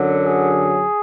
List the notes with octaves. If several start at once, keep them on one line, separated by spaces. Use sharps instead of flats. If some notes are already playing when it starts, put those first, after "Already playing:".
Already playing: F#2 D3 F#3
G#4